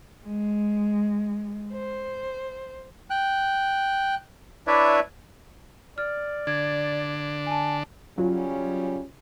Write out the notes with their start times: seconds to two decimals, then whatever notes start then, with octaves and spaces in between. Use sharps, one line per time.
0.26 G#3
1.73 C5
3.10 G5 F#6
4.67 D4 E4 B4 C#5 D5 E5
5.98 D5 F6
6.47 D3 D4 G#6
7.46 G#5 A5
8.18 C#3 F#3 G3 C#4 F4